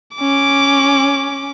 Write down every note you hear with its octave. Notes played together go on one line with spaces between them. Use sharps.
C#4 D6